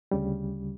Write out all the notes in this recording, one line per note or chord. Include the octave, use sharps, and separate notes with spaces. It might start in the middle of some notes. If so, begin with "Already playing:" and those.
D2 C#3 G3